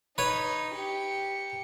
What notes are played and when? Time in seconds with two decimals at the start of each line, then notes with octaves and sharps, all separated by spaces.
0.18 D#4 B4 C#5
0.74 G4 C#7